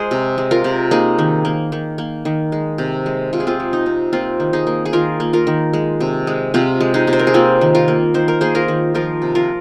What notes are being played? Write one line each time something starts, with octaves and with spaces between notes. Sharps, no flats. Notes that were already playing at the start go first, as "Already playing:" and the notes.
Already playing: G#3 G#4 A#4 C5
C3
G#3
F4 A#4
C3
A#3 D#4 G#4
D#3
A#3
D#3
A#3
D#3
G#3
C3
G#3
C3 F4
G#4
C4 F4
G#3
D#4
C3
A#3 C4 F4
D#3
D#4 G#4
A#3
G#4
D#3 F4 A#4
A#3
F4 A#4
D#3
G#3
C3
G#3
C3 C4 F4
G#3
D#4 G#4
C3
C5
A#4
G#4
A#3 C4 F4
D#3
F4 A#4
A#3
D#3 C5
A#4
A#3 G#4 C5
F4 A#4
D#3
F3 F4 A#4
C3
F4 A#4